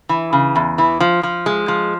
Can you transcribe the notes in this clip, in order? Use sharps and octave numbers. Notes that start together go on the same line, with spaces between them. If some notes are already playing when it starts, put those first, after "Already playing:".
E3
C#3
E2
E3
F3
F3
G#3
F3